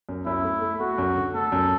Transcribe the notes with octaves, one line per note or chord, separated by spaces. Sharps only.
F#2
F#2 E4
A3
A3
A3 F#4
F#2
D3
A3 A4
F#2